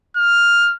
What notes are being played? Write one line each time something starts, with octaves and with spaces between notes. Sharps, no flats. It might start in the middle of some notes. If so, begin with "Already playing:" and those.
F6